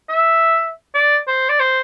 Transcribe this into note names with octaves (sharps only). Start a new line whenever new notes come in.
E5
D5
C5
D5
C5